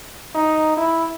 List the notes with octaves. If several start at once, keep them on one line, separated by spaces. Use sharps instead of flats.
D#4
E4